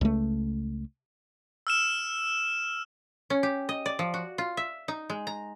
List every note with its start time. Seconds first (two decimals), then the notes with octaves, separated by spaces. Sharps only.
0.01 C#2 A3
1.67 E6 F6 E7
3.30 C#4
3.43 G4
3.69 D#5
3.86 D5
3.99 F3
4.14 F#4
4.38 F4
4.57 E5
4.88 D#4
5.10 G#3
5.27 A#5